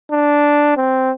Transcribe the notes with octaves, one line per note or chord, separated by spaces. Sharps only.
D4
C4